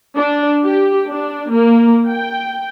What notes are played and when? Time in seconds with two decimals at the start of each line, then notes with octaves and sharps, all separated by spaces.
0.16 D4
0.63 G4
1.10 D4
1.53 A#3
2.08 G5